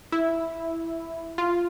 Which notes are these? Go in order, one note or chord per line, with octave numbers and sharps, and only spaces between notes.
E4
F4